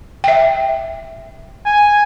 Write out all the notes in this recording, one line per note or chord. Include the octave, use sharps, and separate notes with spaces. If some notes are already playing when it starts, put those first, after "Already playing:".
E5 G5
G#5